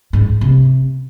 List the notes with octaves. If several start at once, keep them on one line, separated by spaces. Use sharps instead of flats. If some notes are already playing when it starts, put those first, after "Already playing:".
G#2
C3